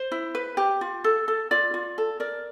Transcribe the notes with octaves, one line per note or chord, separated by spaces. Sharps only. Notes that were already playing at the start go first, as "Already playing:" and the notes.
Already playing: C5
E4
B4
G4
F4
A4
A4
F4 D5
F4
A4
A#4 D5